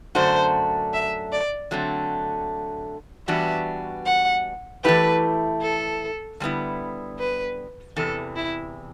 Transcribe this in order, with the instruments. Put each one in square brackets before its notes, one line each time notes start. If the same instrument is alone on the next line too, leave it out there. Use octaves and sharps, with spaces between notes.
[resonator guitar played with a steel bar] F#2 D3 A3 D4 F#4 [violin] C5
[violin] E5
D5
[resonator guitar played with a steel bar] D3 F#3 A3 C4
[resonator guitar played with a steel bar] E3 G3 B3 D4 F#4 [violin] E5
[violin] F#5
[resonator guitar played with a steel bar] E3 A3 E4 G4 [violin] B4
[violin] A4
[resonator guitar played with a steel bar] D3 G3 B3 E4
[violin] B4
[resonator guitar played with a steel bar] E2 C3 E3 [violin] A4
[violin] E4